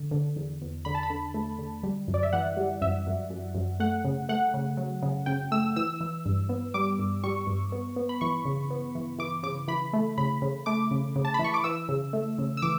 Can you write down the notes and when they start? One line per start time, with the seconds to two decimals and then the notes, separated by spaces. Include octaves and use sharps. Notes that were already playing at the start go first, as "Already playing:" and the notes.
Already playing: D3
0.11 D3
0.36 E2
0.62 E2
0.85 D3 B5
0.95 A5
1.03 B5
1.10 D3
1.34 A3
1.58 D3
1.83 G3
2.08 F#2
2.14 D5
2.23 E5
2.33 E3 F#5
2.57 G3
2.82 F#2 E5
3.07 F#2
3.30 F#2
3.55 F#2
3.80 A3 F#5
4.04 C#3
4.29 A3 F#5
4.54 C#3
4.77 F#3
5.02 C#3
5.26 C#3 G5
5.51 A3 E6
5.76 E3 E6
6.01 E3
6.25 G2
6.49 B3
6.74 G3 D6
6.99 G2
7.24 G3 C#6
7.47 G2
7.72 B3
7.96 B3
8.09 B5
8.21 E3 C#6
8.45 C#3
8.70 B3
8.95 E3
9.19 E3 D6
9.43 C#3 D6
9.68 E3 B5
9.93 A3
10.18 C#3 B5
10.42 C#3
10.66 A3 D6
10.91 C#3
11.16 C#3
11.25 A5
11.34 E3 B5
11.44 C#6
11.54 D6
11.64 E3 E6
11.89 C#3
12.13 A3
12.38 C#3
12.57 E6
12.62 E3 D6